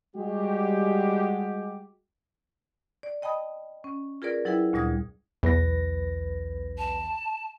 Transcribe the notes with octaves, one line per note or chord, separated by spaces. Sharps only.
G3 G#3 F#4 G4
D5
D#5 G5 A5 B5 D#6
C#4
F4 G#4 A#4 B4 D5
F#3 E4 G#4 B4 E5 G5
D2 A#2 G3 D#6 G#6
B1 E2 B4 A#6
A5